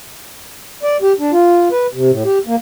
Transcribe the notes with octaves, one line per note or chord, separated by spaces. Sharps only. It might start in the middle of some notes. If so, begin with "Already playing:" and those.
D5
G4
D4
F4
B4
C3
A2
G4
A#3